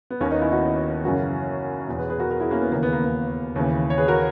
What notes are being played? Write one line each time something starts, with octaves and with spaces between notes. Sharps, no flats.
B3
D#2 D#3 A#3 C#4
B3 D#4
C#4 E4
D#4 F#4
F#2 C#3 E3 F#4 A#4
E2 B2
G#4 B4
G#4 B4
F#4 A#4
F#4 A#4
E4 G#4
A#3 C#4
B3
D#2 C#3 E3 A#3
B3
A#3
B3
D#2 C#3 E3
C#5
G#4 B4
F#4 A#4